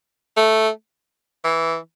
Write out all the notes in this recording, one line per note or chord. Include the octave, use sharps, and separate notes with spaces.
A3
E3